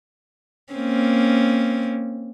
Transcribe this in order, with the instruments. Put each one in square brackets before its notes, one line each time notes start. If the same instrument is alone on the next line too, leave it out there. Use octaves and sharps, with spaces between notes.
[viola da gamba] A#3 C4 C#4